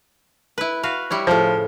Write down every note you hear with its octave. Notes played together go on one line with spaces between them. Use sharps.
E4 B4
F#4 B4 F5
G3 E4 C#5
A2 C#3 F3